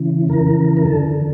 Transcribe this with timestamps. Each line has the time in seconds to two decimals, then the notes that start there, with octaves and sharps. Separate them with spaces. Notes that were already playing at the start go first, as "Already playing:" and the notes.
Already playing: C#3 E3
0.28 F2 C#3 E3 A#4
0.77 A#4
0.86 F2 D3 A4